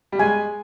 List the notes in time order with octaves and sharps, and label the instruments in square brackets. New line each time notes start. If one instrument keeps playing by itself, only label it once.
[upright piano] G3
[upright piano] G#3 [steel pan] G#5